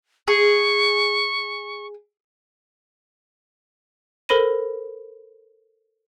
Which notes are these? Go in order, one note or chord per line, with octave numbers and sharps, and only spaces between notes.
G#4 C#6
A4 A#4 C5 B5 A#6 D#7